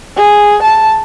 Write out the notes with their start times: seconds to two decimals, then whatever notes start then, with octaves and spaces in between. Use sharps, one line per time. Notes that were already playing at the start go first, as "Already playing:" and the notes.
0.17 G#4
0.63 A5